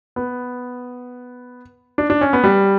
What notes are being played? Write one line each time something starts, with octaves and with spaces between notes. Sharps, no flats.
B3
D4
D4
C#4
B3
G3